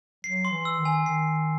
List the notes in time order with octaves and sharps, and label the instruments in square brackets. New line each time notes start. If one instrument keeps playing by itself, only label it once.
[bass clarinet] F#3 [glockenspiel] C7
[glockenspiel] C6
[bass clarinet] E3
[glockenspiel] E6
[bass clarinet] D#3
[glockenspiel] G#5
[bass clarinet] D#3 [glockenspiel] C7